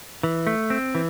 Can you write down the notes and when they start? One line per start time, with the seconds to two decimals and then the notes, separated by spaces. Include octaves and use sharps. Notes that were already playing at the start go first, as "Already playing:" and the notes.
0.23 E3
0.47 A3
0.70 C4
0.95 E3